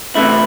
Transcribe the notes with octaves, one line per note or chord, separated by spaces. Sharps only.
C3 E3 A3 E4